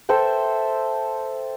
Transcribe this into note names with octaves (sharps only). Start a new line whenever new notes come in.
A4 C5 E5 G5